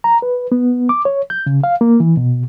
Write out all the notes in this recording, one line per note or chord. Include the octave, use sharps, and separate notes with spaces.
A#5
B4
B3
D6
C#5
G6
C#3
F5
A#3
E3
B2